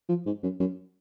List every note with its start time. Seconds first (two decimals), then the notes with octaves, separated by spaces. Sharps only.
0.09 F3
0.26 G#2
0.43 F#2
0.60 F#2